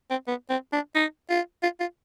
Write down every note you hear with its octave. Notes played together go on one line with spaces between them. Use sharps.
C4
B3
C4
D4
D#4
F4
F4
F4